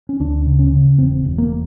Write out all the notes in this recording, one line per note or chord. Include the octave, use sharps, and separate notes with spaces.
C#4
D2 D4
C#3
C#4
C#3
E1 C4
E1
A#3